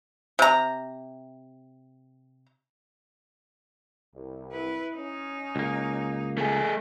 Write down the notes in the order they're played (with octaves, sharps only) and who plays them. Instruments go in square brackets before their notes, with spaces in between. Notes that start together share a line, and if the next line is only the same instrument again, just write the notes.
[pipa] C3 A#5
[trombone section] C2
[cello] E4 B4
[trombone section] C#4 [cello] D#4
[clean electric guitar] C#2 A#3
[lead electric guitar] A3 G#4